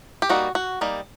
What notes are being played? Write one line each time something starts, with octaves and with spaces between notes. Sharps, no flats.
G4
G3 A#3 D#4 F#4
F#4
G3 A#3 D#4